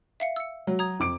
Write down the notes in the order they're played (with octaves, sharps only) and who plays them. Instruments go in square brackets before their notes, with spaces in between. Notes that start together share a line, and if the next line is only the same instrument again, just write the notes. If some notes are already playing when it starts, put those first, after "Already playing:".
[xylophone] E5 F5 C#7
E6 C#7
[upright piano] F#3
[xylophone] A#5 D#6 G#6
[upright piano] F2 D6 D7